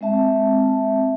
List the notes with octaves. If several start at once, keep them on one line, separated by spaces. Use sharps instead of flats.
G#3 C4 E5 A5